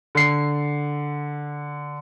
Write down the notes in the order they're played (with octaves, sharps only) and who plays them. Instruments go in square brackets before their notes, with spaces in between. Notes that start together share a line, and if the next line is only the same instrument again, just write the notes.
[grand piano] D3 C7